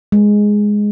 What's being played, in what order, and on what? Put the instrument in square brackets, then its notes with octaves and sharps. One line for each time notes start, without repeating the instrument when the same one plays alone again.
[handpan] G#3